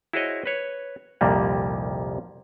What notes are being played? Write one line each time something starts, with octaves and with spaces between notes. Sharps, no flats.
E4 F#4 G#4 C5 C#5 D#5
B4 C#5
C2 F2 A#2 D#3 G3 A#3